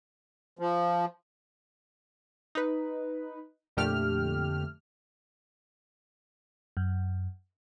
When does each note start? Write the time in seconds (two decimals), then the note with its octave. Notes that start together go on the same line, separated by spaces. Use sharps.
0.59 F3
2.55 D#4 B4
3.77 F2 A#2 D3 A3 G4 F6
6.77 F#2